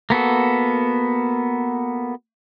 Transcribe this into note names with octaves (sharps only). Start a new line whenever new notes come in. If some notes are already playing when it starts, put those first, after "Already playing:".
A#3 B3 F#4 A4